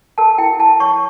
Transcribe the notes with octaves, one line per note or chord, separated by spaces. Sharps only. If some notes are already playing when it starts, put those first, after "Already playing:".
A#4 A5
E4 G5
E4 A5
C#5 C#6